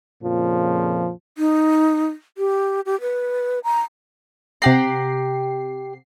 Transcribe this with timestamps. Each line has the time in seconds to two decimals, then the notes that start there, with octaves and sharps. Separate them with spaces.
0.22 F2 A#2 C#3 F3
1.38 D#4
2.38 G4
2.86 G4
3.01 B4
3.64 A#5
4.62 C3 G4 F#5 A#5 C7